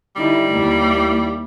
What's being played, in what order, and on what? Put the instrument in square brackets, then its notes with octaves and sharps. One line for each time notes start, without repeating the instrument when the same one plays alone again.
[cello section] D3 D#4 E4 [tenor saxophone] G3
[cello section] D#2 A#3 E4